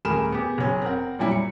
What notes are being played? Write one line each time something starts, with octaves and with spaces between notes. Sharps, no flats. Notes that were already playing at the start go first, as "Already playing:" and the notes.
D#1 A3 G#4 A#4 B5 E7
B3 G4 G#4
F#1 C#4
C4 A#4 F#5
A#2 F#3 G3 E4
C#7